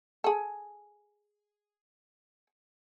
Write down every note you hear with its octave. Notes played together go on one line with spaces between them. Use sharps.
G#4 A4